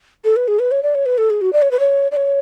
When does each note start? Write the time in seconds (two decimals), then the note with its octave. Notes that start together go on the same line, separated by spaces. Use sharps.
0.25 A4
0.36 B4
0.48 G#4
0.59 B4
0.71 C#5
0.83 D5
0.95 C#5
1.06 B4
1.18 A4
1.30 G#4
1.41 F#4
1.53 D5
1.62 C#5
1.71 B4
1.79 C#5
2.12 D5
2.16 C#5